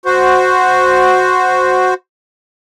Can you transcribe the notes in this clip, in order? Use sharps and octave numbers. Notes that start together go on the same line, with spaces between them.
F#4 C5